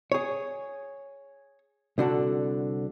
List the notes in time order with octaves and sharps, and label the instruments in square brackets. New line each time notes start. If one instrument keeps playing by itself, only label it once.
[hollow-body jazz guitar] G#4 C#5
C2 D3 F#4 A4